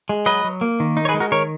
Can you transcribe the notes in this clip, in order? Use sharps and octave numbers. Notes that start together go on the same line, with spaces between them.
G#3
F#3 B4 D#5
F#3
A#3
D#3
D#4
C#5
G#4 B4
G#3
F#4 A#4
D#3 A#4 C#5